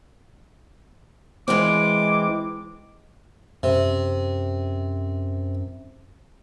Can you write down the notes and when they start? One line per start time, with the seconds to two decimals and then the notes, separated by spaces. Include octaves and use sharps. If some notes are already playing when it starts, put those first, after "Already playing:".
1.48 E3 G#3 C4 D6
3.63 F#2 C3